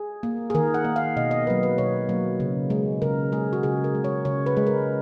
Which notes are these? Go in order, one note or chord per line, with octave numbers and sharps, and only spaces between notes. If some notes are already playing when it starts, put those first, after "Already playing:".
Already playing: G#4
A#3
G#4
D#3 A#4
F#5
A#3
F5
B2 D#5
D#5
F#3 A#3 B4
B4
B2 C#5
F#3 A#3
C#3
G#3
C#3 A#4
G#3 G#4
F#4
C#3 G#4
A#4
G#3
C#5
C#3 C#5
B4
G#3
A#4